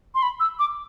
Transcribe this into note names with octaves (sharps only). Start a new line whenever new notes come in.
C6
B5
E6
D6